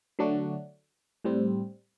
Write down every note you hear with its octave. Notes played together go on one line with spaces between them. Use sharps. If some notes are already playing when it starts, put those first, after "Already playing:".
D3 F#3 A3 D4 F#4
A2 G3 C4